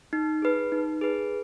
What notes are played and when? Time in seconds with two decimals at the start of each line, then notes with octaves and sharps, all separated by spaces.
0.13 D#4
0.42 G#4 B4
0.72 D#4
1.01 G#4 B4